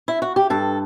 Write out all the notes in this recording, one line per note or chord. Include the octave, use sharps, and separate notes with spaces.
E4
F#4
G4
G2 A4